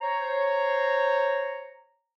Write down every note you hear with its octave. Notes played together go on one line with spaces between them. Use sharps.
C5 C#5 A#5